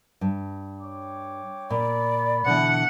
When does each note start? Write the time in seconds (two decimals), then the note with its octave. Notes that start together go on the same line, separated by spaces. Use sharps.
0.21 G2
0.81 C#5 G5 D6
1.70 A#2 D5 B5
2.46 B2 D3 E3 F#5